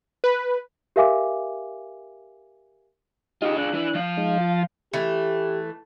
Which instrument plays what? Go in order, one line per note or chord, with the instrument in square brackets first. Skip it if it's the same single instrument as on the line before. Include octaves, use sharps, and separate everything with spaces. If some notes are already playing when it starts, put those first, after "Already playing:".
[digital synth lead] B4
[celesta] G4 A#4 E5 F5 G#5 D6
[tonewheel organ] D#4 G4 D#5 [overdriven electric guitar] F4 G#4
[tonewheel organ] D4 F#6
[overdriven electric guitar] E3 E4
F3 F5
[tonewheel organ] G#3 D#4
F4 A6
[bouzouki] E3 A3 [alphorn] G4